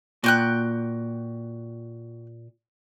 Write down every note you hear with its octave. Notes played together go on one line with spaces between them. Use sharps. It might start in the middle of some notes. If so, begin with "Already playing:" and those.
A#2 F#4 G5 F#6